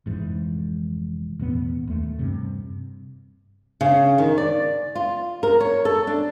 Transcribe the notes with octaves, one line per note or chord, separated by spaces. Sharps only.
F1 G#2 E3
E1 A1 B3
D#2 A3
G2 C3
C#3
D#3
D5
F4
A#4
C#5
A4
D4